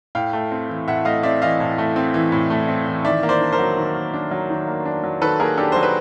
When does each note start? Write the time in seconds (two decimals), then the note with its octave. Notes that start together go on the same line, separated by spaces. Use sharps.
0.15 A2 F5 G5
0.33 A3
0.52 C4
0.69 E3
0.88 A2 E5 F#5
1.05 A3 D#5 F5
1.23 C4 D5 E5
1.42 E3 D#5 F5
1.60 A2
1.78 A3
1.96 C4
2.14 E3
2.32 A2
2.50 A3
2.68 C4
2.86 E3
3.05 D#3 D5 E5
3.23 A#3
3.29 C5 D5
3.41 D4
3.52 A#4 C5
3.59 F#3
3.77 D#3
3.95 A#3
4.14 D4
4.31 F#3
4.50 D#3
4.67 A#3
4.85 D4
5.04 F#3
5.22 D#3 A4 B4
5.40 A#3 G#4 A#4
5.58 D4 G4 A4
5.72 F#3 C5
5.83 B4